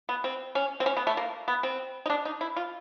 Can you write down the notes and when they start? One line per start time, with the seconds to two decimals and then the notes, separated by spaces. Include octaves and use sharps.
0.09 B3
0.24 C4
0.55 C#4
0.80 C4
0.86 C#4
0.97 B3
1.07 A3
1.17 A#3
1.48 B3
1.63 C4
2.06 D#4
2.10 D4
2.25 D#4
2.41 E4
2.57 F4